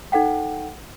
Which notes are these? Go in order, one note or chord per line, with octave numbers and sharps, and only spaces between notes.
D#4 A4 F#5 G5